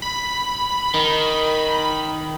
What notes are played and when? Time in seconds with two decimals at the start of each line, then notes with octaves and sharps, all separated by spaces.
0.02 B5
0.94 D#3